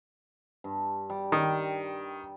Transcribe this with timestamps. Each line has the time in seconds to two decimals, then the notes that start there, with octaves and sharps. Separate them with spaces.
0.64 G2
1.10 G3
1.32 D#3